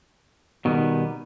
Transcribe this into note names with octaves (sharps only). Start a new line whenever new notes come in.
B2 D#3 G3 B3